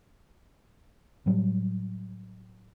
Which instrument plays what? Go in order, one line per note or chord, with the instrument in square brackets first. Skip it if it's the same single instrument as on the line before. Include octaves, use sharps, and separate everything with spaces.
[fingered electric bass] A2 F#3 G3